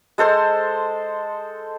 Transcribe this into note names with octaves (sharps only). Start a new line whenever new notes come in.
G#3 A4 C5 C6